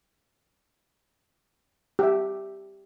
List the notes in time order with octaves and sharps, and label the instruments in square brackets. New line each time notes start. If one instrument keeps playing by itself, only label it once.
[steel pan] G4 E5